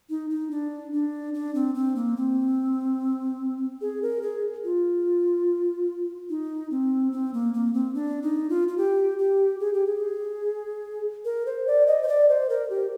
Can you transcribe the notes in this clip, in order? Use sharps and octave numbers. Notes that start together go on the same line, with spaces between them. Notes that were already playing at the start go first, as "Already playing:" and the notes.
D#4
D#4
D4
D4
D4
C4
C4
A#3
C4
G#4
A#4
G#4
F4
D#4
C4
C4
A#3
A#3
C4
D4
D#4
F4
F4
G4
G4
G#4
G4
G#4
A#4
C5
D5
D#5
C5
D5
C5
A#4
G4